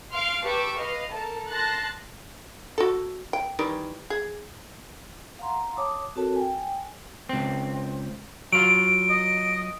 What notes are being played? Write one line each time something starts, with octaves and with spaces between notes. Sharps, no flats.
F5 C6 F6 D7
G4 B4 A5 C#6 D6 E6
B4 D#5 F5
A4 A#4 A5
A5 C6 F#6 A6 A#6
F#4 A4
G5
D#3 E3 G3
G#4
F5 F#5 A#5 C6
C#5 A5 D6 D#6
C4 F#4 A4 A#4 C#5 A5
G5 G#5
C#2 C4
F#3 F4 D7
D#5